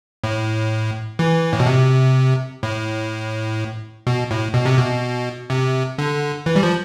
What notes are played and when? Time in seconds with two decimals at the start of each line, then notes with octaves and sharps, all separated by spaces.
0.24 A2
1.19 E3
1.53 A2
1.60 B2
1.66 C3
2.63 A2
4.07 B2
4.31 A2
4.54 B2
4.66 C3
4.78 B2
5.50 C3
5.98 D3
6.46 E3
6.56 G3
6.63 F3